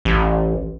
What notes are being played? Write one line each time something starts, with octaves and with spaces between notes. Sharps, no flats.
A1